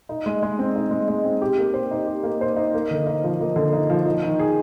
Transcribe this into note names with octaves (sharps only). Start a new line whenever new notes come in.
D#4
G#3
G#3
C4
D#4
G#3
G#3
C4
G4
A#3
C5
D#4
G4
A#3
C5
D#4
A#3
D3
D#4
F3
A#3
D3
D#4
F3
D#4
D#3
G#4